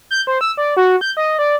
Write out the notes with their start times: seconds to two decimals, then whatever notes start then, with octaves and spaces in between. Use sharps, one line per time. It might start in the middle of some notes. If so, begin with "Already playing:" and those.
0.11 G6
0.27 C5
0.41 E6
0.57 D5
0.77 F#4
1.01 G6
1.17 D#5
1.39 D5